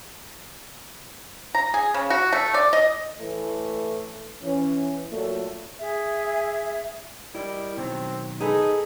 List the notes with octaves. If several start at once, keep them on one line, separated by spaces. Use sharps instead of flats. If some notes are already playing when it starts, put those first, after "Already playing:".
A#5
G#4
C#3
F#4
A3
D5
D#5
A2 E3 A3
E3 C#4
A#2 F#3 A3
G#4 E5
G3 E4 A#4 D#5
B2 D#3 F#3 C4
D#4 G#4 A4 B4